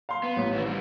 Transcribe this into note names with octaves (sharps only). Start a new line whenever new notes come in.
F5 C6
B3
A1
D#3 E3 C4
D3 G3